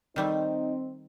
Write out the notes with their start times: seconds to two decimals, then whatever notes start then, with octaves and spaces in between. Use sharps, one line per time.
0.16 D#3 G3 A3 C4 D#4